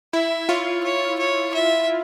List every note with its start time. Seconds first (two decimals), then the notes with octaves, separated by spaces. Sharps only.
0.13 E4 E5
0.49 F4 C#5
0.84 C#5
1.19 C#5
1.54 E5